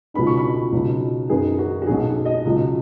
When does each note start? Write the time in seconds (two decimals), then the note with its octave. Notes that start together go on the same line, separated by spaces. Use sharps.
0.14 C#2 B2 B3 D#4 B5
0.27 C#6
0.37 B5
0.72 C#2 B2 F#3 B3 D#4
1.30 F#2 D#3 B3 D#4 G#4
1.59 F#4
1.82 F#4
1.87 B1 B2 F#3 D#4 G#4
2.25 D#5
2.45 C#2 B2 F#3